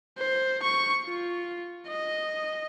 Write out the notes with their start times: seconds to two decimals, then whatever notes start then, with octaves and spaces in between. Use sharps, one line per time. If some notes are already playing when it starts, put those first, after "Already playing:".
0.18 C5
0.63 C#6
1.06 F4
1.88 D#5